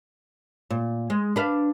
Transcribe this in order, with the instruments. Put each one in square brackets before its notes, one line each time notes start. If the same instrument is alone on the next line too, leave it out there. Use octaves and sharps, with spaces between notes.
[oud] A#2
G#3
D4 B4 F5